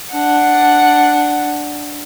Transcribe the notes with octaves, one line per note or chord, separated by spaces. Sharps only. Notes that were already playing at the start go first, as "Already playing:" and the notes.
D4 F#5